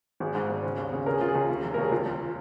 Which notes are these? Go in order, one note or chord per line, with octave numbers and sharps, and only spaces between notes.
G#1 G#4
G#2
G#1
C#3
D#2
C#3
C#3 A#4
G#4
C#3 F4
G#4
C#2
D#2
F1
A#4
D#2 G#4
C#2 F4
C#2